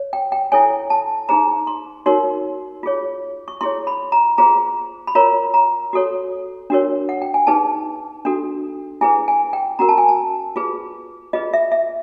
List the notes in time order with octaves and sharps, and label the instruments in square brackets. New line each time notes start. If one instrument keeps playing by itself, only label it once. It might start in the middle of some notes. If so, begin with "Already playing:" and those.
Already playing: [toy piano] C#5
G5
G5
E4 A4 C#5 G#5
A5
D#4 G#4 C5 A#5
C6
D#4 F#4 A#4 C#5 C6
F4 G#4 C#5
C#6
E4 G#4 C#5 C6
B5
A#5
F4 G#4 C5 A#5
B5
F4 A#4 C#5 A#5
A#5
F#4 A4 C#5
D4 F#4 A#4 C#5
F#5
G5
G#5
D#4 G#4 B4 A5
D4 F#4 A4
E4 G#4 B4 G#5
G#5
G5
C#4 F#4 A#4 A#5
A5
G#5
A5
F4 G#4 B4
F4 G#4 B4 D#5
E5
E5